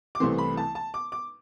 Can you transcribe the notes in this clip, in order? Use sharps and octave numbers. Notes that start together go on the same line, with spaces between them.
D6
C2 C3 E3 A3 C4 C6
B5
A5
A5
D6
D6